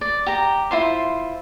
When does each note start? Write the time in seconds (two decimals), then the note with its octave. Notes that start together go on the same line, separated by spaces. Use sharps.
0.01 D5
0.26 G4 A#5
0.71 E4 F4 C5